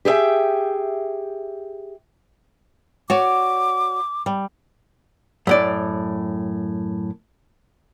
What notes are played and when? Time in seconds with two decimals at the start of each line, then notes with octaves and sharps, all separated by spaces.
0.05 G4 G#4 C5 E5 G5
3.10 F#4 C#5 D5 D6
4.26 G3
5.47 F#2 A2 D5